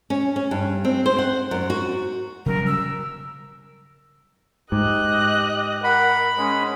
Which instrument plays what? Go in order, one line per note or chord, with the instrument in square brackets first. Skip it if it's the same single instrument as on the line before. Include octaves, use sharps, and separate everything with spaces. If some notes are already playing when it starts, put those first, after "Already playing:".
[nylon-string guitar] C#4
C#4
G2
C4
C5
F#5
F#2
F#4
[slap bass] C#3 F#3 G3 [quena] A#4
[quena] E6
[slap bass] G#2 [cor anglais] G4 [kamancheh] D#5 F#6
[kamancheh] A#4 [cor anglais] F#5 [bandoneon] B5
[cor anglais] G#3 [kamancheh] C#4